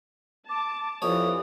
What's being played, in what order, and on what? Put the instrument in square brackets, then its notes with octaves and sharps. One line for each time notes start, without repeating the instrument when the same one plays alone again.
[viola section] A5 [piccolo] D6
[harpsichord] F2 C#5 [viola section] E3 G4 D5 [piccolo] D#6